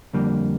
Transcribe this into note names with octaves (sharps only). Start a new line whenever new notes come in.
F2 D3 G3 A#3